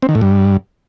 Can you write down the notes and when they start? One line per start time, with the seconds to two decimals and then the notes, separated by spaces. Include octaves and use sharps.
0.02 C4
0.09 D#3
0.15 A2
0.21 G2